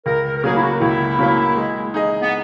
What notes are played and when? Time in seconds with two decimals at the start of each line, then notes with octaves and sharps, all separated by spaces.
0.06 C#2 A#4
0.25 A#4
0.37 A#4
0.44 C#3 F#3 A#3 G#4
0.57 E4
0.62 F#4
0.81 C#2 E4
1.19 C#3 F#3 A#3
1.56 G#3
1.94 D#4 G#4 D#5
2.22 B3